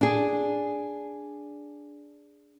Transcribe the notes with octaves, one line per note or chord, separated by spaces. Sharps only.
D4 G#4